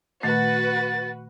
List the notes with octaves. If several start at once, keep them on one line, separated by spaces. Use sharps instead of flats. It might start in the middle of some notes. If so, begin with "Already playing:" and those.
A#2 D#3 A3 F#4 B4 A6